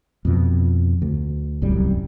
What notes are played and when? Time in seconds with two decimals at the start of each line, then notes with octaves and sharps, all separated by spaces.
0.25 F2 B2 F3
1.02 D2
1.62 D1 C2 F#2 G3